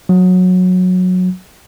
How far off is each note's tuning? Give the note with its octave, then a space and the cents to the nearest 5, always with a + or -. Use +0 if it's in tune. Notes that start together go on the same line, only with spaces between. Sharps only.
F#3 -20